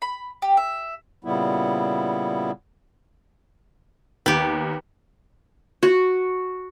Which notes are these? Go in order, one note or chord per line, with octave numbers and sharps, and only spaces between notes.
B5
G4
E5
A#2 C#3 G3 B3 E4
D#2 B3 G4
F#4